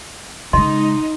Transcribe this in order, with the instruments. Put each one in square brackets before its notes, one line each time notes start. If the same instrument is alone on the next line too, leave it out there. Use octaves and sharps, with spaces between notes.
[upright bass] C#3 G#3 [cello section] D#4 [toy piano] D#5 C6